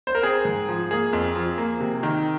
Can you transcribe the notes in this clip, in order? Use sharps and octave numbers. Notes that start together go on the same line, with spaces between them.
C5
A#4
C4 G#4
G#2
F3
A#3 G#4
F2
F3
A#3
C3
D#3